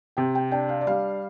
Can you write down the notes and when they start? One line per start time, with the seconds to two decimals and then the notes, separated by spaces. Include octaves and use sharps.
0.17 C3 G5
0.35 G5
0.51 D4 G5
0.69 F5
0.81 D5
0.87 G3 F5